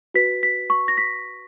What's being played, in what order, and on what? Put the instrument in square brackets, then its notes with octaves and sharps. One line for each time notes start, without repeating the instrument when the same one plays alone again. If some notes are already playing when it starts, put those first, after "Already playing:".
[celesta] F#4 B4 B6
B6
C#6
A#6
B6